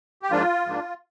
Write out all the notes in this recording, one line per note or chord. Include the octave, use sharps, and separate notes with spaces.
G4
G#2 F3 A#3 D4 F4
G#2 F3 A#3 D4